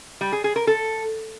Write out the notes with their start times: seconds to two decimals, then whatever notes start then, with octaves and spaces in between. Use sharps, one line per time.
0.21 G3
0.32 G#4
0.44 G#4
0.56 A#4
0.67 A4